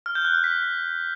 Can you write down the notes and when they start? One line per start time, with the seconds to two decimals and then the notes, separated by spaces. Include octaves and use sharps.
0.06 F6
0.15 G6
0.25 F#6
0.34 F6
0.44 B6